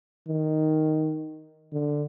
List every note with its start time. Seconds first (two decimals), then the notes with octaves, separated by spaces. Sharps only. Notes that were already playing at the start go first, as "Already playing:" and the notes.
0.28 D#3
1.73 D3